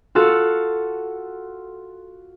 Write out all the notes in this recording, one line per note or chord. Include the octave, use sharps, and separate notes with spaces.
F4 F#4 A4